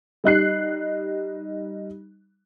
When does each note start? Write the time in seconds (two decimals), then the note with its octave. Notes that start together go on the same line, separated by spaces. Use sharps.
0.24 G3 D#4 F#6 C7